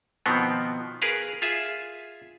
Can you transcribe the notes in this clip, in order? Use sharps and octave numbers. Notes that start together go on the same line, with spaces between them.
B2 D#3 F3 B3 C4
G#4 A#4 B4 F5
F4 G#4 E5